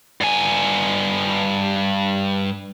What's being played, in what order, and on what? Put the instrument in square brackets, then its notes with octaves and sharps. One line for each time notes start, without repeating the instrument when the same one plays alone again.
[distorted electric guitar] G2 G#5